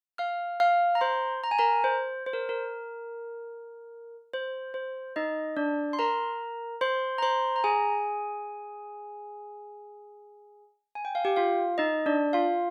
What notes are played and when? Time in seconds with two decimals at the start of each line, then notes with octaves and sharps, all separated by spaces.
0.18 F5 F6
0.60 F5 F6
0.95 A#5
1.01 C5 C6
1.44 A#5
1.51 G#5
1.58 A#4 A#5
1.84 C5
2.26 C5
2.33 A#4
2.49 A#4
4.33 C5
4.74 C5
5.16 D#4 D#5
5.57 D4 D5
5.93 C6
5.99 A#4 A#5
6.81 C5 C6
7.18 A#5
7.22 C5 C6
7.56 A#5
7.64 G#4 G#5
10.95 G#5
11.05 G5
11.15 F5
11.25 G4 G5
11.36 F4 F5
11.78 D#4 D#5
12.06 D4 D5
12.33 F4 F5